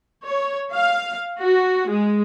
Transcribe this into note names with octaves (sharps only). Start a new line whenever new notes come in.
C#5
F5
F#4
G#3